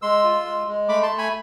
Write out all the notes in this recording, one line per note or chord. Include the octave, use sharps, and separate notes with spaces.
G#3 C6 E6
F4
G#3
G#3
A3 B5 D6
A5 C6
A3
G#5 B5